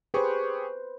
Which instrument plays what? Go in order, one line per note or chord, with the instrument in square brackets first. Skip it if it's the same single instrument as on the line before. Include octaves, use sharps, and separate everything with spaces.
[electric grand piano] G4 G#4 C#6 [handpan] B4 C5